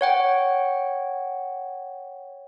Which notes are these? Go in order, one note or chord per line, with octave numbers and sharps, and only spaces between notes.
C#5 F#5 G5